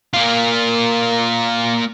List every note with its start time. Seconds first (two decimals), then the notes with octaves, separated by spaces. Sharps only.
0.14 A#3 F4